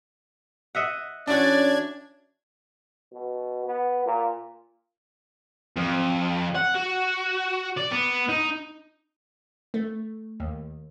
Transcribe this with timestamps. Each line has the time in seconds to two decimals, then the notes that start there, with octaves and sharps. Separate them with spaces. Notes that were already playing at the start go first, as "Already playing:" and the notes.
0.75 D#5 E5 F#5
1.28 E3 C#4 D4 F#4 D5 G#6
3.12 B2
3.65 B3
4.06 A#2
5.77 F2
6.55 F#5
6.75 F#4
7.78 D5
7.92 B3
8.29 D#4
9.74 A3
10.40 D#2